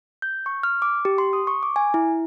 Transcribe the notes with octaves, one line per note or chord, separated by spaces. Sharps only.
G6
C#6
F6
D6
G4
C6
D#6
C#6
D6
G#5
E4